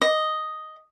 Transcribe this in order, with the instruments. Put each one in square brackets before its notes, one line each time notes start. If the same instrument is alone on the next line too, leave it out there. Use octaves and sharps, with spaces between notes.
[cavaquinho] D#5